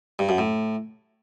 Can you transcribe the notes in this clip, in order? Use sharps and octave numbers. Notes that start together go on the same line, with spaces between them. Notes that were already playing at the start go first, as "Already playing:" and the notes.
G2
F#2
A2